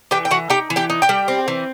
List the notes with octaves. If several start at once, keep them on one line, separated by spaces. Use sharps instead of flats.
E3 G4 G5
G5
E3 F#4 F#5
D#4 G4 G5
E3
G4 G5
D#4
G4 G5
G3
C4
E3